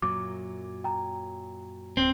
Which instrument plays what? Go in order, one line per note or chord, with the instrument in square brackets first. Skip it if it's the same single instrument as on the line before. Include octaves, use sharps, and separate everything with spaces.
[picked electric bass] F#2 A#2 F#3 [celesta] D6
[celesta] G5 A#5
[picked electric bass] D1 [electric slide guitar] C4